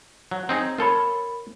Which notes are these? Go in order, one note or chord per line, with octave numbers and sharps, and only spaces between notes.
F#3
C4 D#4 G#4
F4 A4 A#4 C#5 B5